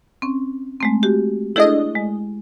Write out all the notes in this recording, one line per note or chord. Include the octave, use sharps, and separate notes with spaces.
C4 C#4
G#3 A3 C4
F#4 G4
A3 D4 E4 G#4 D#5
G#3